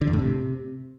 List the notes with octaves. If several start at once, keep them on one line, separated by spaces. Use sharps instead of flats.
D3
E2
A2
C3